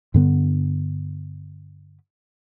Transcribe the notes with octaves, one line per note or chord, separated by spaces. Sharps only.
G2 D3 B3